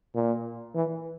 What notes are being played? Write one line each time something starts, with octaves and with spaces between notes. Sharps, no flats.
A#2
E3